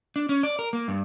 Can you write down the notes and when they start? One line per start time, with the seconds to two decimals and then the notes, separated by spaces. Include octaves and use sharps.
0.16 D4
0.29 C#4
0.43 D5
0.59 A#4
0.73 A#3
0.88 G2